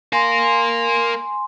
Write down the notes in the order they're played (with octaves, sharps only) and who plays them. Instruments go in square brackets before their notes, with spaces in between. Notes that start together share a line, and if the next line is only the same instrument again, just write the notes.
[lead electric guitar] A#4 F5 [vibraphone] G#5 C6